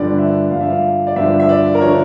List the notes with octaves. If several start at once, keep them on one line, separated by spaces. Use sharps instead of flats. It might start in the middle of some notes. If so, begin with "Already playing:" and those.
Already playing: G2 D3 F3 D5
E5
G2 D3 F3 F5
E5
F5
D5
G2 D3 F3 E5
E5
D5
A#4
D3 F3 C#5